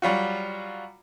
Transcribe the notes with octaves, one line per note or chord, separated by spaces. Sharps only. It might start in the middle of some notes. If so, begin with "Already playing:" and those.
F#3 G3 F4 F#4